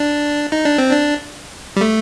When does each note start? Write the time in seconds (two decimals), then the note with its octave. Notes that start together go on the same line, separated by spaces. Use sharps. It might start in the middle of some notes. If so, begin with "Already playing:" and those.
Already playing: D4
0.52 D#4
0.65 D4
0.78 C4
0.91 D4
1.76 G3
1.81 A3